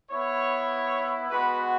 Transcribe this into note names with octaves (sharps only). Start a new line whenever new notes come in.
B3 E4 C#5
G#3 B3 F#4 B4